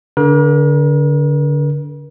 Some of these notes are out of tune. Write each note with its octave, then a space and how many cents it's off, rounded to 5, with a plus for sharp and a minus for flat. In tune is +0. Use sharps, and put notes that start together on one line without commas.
D3 -20 A#4 +45